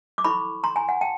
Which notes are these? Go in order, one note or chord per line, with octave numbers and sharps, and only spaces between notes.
D6
E4 A4 C5 B5 C#6
A#5 C6
G#5 A#5
F#5 G#5
G5 A5